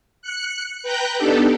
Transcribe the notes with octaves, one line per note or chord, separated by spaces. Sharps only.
F#6 C#7
B4 G5 A#5 F#6 G6
B3 D4 D#4 G4 A4